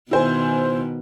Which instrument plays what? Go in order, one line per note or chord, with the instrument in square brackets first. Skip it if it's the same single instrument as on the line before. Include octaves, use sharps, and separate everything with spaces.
[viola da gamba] B2 D#3 [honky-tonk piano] E4 C5 G#5